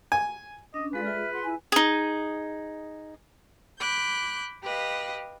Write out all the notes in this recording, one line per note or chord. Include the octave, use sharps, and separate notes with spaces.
G#5
C#4 D4 D#5
G#3 F4 G#4 A4 B4 D5 F5
F4 G#4 E5 F6
F#5 C6
E4 G#5
D#4 G#4
B5 D6 F#6 G6
G4 B4 D#5 F5